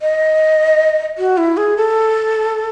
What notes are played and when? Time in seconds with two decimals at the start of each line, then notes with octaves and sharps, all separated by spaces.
0.02 D#5
1.18 F#4
1.38 E4
1.57 G#4
1.77 A4